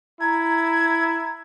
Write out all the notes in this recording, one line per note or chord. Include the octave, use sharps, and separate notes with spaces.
E4 A#5 G#6